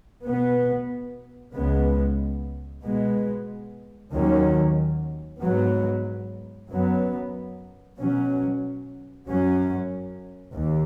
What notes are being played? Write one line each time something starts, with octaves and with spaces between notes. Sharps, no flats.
B2 B3
C#2 C#3 G#3 B3
B2 G#3 B3
D#2 D#3 F#3 C#4
G#2 F#3 B3
F#2 F#3 B3
B2 F#3 C#4
F#2 F#3 C#4
D#2